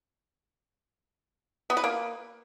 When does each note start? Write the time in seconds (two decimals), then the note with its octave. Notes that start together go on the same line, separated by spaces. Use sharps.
1.70 B3
1.77 B4
1.84 A#3